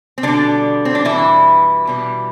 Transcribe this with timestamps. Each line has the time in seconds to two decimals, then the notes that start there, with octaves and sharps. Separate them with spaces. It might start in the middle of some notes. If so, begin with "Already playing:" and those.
0.18 C4
0.23 B2 D3 G3 D4
0.85 C4
0.95 D4
1.05 B2 E3 G3 E4
1.87 B2 G3